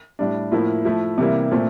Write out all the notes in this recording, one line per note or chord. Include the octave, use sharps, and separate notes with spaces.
A2 G3 D4
A2 F3 A#3 E4
F3 A3 E4
C3 E3 G3 A#3 E4
A#2 A3 C4